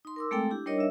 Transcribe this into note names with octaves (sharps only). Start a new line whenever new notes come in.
D#4 C6
A#4 D6 E6
G#3 A3 C4 A4 G5
D4 E4 G4
G3 D4 D#4 A#4 C#5 D#5
E5 E6